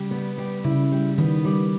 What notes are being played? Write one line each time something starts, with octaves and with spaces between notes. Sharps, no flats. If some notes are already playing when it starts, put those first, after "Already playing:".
Already playing: C#3 G3
B3
G3
C#3 E4
G3
D#3 B3
G3